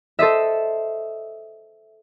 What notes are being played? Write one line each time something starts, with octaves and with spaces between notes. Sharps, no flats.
A4 C5 D#5 E5